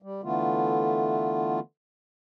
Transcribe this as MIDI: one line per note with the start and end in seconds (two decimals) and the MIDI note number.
0.02 0.21 55
0.23 1.60 50
0.23 1.60 52
0.23 1.60 57
0.23 1.60 59
0.23 1.60 65